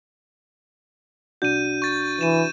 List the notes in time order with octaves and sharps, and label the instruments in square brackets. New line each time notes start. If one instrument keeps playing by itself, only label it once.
[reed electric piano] C2 D4 F#4 [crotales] G6 D#7
[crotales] C#6 A6
[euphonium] E3 [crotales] D#7 E7